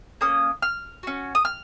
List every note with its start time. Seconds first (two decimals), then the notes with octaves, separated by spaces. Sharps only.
0.21 A#3 C#4 D#6
0.62 F6
1.03 C#4 F#4
1.35 D#6
1.45 F6